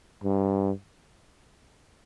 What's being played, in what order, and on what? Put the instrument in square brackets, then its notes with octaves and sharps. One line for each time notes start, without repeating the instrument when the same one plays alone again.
[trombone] G2